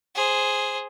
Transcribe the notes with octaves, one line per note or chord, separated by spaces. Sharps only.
G#4 C5